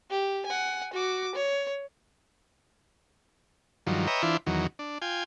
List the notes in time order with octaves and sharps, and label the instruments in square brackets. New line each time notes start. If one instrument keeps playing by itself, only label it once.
[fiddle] G4
F#5 G#5
F#4 D6
C#5
[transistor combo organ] G2 D#3 F3 F#3
B4 C#5 D#5 E5 G5 A#5
E3 D4 E4 F4 C5
E2 D#3 F#3
D4
F4 G5 G#5